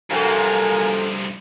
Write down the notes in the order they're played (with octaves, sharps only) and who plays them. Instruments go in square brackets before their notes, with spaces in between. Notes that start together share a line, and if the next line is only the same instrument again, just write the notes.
[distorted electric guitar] G2 F3 [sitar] C3 F#4 A4 [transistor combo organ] A#4 F5 G#5